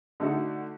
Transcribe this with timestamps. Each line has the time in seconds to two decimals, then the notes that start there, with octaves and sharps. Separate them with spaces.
0.20 D3 A3 D#4 F#4